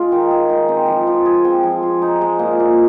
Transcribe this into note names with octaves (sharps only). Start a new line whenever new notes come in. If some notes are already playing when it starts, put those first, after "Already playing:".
Already playing: G#3 F4 G#4
D#3
G#4
D#4
C4
F3
F3
G#4
C4
F3
G#4
D#4
G#3
A#2
A#2